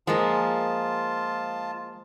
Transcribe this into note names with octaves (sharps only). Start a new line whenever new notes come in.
F3 G#3 A#3 F4 A5